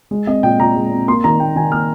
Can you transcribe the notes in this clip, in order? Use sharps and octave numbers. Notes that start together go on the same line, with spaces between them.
G#3
C4 D#5
A#2 G5
A#2 A#5
G#3
C4
A#3 C6
D#3 A#5
A#3 G5
D#3 G#5
A#3 F6